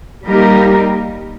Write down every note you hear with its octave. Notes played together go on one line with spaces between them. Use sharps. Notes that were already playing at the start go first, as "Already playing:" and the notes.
G3 A#3 D#4 G4 A#4